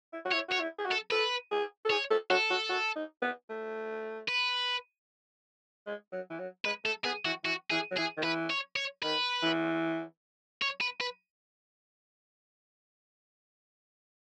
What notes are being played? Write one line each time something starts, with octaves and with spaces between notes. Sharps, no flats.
E4
F#4
E4 C#5
F#4 C#5
E4
G#4
F#4
A4
A4 B4
G#4
A4
G#4 C#5
A4
F#4 A4
F#4
F#4
D#4
B3
A3
B4
G#3
F#3
E3
F#3
G#3 B4
A3 A4
B3 G#4
E3 F#4
E3 F#4
E3 G#4
F#3
E3 G#4
D#3
E3 B4
C#5
C#5
D#3 B4
E3
C#5
B4
B4